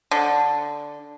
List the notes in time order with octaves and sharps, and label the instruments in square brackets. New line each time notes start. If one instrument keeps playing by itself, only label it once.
[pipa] D3